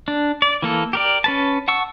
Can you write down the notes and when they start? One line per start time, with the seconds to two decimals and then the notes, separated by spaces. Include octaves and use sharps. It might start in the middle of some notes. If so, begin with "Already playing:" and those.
0.08 D4
0.42 D5
0.62 E3 A#3 A4
0.93 G4 A#4 D5
1.24 C#4 B4 A5
1.68 F#5 A5 C#6 E6